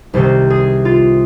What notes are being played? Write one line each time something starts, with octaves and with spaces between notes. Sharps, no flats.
C2 C3 D#3 C5
G#4
F4